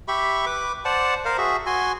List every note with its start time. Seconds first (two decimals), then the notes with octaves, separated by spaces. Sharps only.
0.08 G4 E5 B5 C#6
0.46 B4 D6
0.85 C5 D5 F#5 A5
1.25 A#4 C5 F5
1.38 F#4 G#4 E5
1.66 F#4 G#5 C6